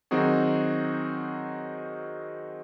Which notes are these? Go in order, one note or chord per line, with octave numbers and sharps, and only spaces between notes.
D#3 F#3 C4 D#4 F#4 G#4